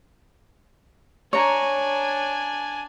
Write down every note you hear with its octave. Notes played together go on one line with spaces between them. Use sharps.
D4 C#5 G#5 A#5